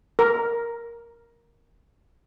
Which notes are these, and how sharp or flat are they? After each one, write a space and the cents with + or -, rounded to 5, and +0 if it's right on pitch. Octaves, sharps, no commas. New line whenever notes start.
A#4 +5